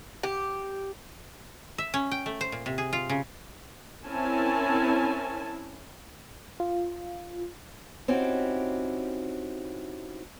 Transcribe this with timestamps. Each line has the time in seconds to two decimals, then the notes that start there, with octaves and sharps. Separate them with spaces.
0.23 G4
1.78 E5
1.94 C#4
2.11 G5
2.26 A3
2.41 C5
2.52 A#2
2.66 C3
2.78 G#4
2.93 F4
3.10 C#3
4.06 C4 C#4 E4 A#4 G#5 A5
6.60 F4
8.08 C4 C#4 D#4 E4 F#4 G4